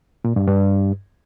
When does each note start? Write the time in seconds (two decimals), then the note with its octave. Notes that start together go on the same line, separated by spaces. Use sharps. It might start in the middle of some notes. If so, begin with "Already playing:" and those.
0.24 A#2
0.36 G2
0.48 G2